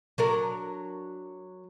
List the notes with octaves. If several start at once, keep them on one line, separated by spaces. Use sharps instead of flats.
F#3 D4 A#4